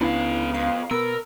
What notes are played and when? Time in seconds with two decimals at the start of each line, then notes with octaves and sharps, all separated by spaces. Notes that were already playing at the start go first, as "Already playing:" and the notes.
0.01 C#2 C3 B3 C#4 D4 E4 F5
0.54 F2 F5
0.91 B2 B3 A#4 B4 E6